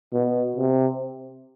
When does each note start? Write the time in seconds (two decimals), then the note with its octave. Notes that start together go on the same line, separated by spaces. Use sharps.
0.13 B2
0.56 C3